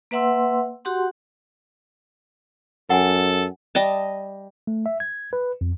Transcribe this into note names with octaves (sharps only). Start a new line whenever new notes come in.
A#3 B4 E5 F#5 C6 E6
F#4 G4 F#5 C6
F#2 A4 F#5 G#5
G3 D#5 A5
A3
E5
G#6
B4
F2